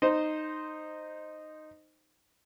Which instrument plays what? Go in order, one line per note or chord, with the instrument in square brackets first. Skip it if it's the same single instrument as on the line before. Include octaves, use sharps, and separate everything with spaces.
[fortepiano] D#4 C5